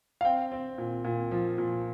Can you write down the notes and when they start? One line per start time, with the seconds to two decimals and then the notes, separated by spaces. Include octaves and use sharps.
0.21 F5
0.25 C4 G5
0.52 C4
0.78 A#2
1.04 A#2
1.31 F3
1.58 A#2